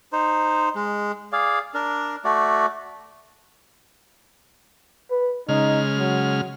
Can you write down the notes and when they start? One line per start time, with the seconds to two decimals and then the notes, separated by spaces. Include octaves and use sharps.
0.13 D#4 C5
0.75 G#3
1.32 G#4 D5 F5
1.74 D4 A#4
2.25 A3 F#4 D5
5.11 B4
5.49 C#3 G#3 D#4 F6
5.98 F#3